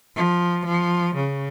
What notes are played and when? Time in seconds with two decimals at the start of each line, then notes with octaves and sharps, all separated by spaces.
0.16 F3
0.66 F3
1.16 C#3